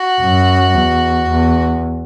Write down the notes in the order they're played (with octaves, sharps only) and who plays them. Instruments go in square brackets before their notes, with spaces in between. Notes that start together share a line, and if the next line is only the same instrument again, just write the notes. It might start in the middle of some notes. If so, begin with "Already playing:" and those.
Already playing: [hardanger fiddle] F#4
[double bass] F#2
E2
E2